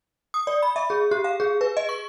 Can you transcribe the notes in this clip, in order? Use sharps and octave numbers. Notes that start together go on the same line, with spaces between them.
D#6
D5
B5
E5
G#4
G4
F5
G#4
B4
D#5
C#6